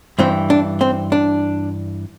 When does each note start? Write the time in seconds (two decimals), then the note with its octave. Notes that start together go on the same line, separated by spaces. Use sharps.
0.19 G2 E3 C4
0.50 D4
0.81 C4
1.12 D4